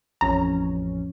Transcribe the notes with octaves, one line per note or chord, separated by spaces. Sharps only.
A1 F2 C#4 A#5